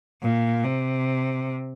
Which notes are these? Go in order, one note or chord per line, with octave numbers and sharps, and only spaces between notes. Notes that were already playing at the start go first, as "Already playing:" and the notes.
A#2
C3